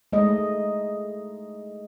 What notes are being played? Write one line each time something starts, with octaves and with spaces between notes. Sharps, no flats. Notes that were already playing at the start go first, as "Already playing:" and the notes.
G#3 A3 D#5